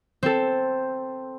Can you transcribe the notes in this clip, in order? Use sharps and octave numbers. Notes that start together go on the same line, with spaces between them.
C4 A4